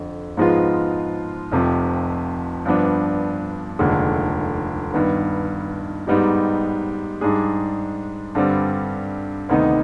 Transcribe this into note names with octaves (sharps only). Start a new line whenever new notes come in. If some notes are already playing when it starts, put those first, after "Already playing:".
Already playing: F2 D3
G#2 F3 G#3 B3 F4
F1 F2 C3 F3
G2 F3 B3 D4
F1 D#2 D3 G#3
G2 D#3 B3
G#2 G3 B3 D#4 G4
G#2 G3 D4 G#4
G2 D3 G3 C4
D2 C3 D#3 B3 D#4